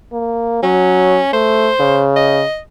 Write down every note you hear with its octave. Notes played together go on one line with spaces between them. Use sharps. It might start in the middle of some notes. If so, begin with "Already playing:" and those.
A#3
F#3 C#4
A3 C5
C#3
D#5